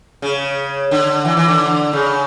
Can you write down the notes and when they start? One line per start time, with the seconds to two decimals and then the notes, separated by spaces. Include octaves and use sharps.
0.22 C#3
0.91 D3
1.25 E3
1.37 E3
1.48 D3
1.93 C#3